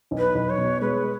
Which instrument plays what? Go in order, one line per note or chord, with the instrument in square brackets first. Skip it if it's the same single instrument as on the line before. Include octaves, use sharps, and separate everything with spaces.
[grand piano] B1
[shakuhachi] B4
[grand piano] B1
[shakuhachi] C#5
[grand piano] B2
[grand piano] G#3 [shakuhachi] B4